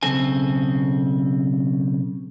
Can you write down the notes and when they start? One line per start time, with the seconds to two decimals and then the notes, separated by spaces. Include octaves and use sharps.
0.03 B1 C#3 C4 A4 G#5